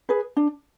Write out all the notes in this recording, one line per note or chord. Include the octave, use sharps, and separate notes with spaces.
G#4 B4
D4